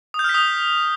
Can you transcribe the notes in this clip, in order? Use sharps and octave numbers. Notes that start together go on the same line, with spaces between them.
D#6
G6
F6
B6
D#6